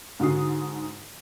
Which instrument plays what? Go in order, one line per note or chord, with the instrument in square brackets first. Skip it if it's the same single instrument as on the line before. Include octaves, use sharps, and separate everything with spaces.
[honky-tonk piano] G#2 D3 F#4 D#6 C7